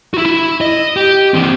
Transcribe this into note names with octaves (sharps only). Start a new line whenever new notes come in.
E4 F#4
E4
D#5
G4
E3 C4